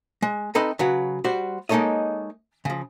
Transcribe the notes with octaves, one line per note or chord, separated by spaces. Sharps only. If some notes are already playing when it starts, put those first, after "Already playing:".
G#3
C4 D#4 A4 B4 D#5 B5
C#3 F#3 B4 F#5
G3 F#4 C5
G#3 A#3 D#4 A4 C#5 D#5
C#3 F3